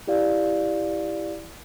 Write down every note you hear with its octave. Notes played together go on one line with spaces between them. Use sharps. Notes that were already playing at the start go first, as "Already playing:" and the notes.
E4 G4 D5 F5